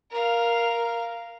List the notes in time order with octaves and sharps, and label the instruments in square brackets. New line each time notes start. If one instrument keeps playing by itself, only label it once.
[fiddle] A#4 F5